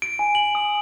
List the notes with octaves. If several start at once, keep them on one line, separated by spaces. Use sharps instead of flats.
D7
G#5
F#7
D#6